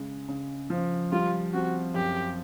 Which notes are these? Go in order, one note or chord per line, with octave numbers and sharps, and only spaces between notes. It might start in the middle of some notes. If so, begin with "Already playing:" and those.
Already playing: C#3 G#3
C#3
F3
G3 F4
C4 F#4
F#2 G4